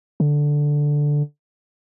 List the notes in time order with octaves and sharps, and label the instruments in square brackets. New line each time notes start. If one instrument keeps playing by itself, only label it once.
[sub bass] D3